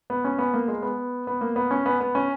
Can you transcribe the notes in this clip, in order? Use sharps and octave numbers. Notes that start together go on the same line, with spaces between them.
B3
C#4
B3
A#3
G#3
B3
B3
A#3
B3
C#4
B3
B3
C#4